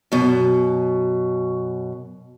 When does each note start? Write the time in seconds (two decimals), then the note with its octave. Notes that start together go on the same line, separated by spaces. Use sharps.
0.12 F#2 B2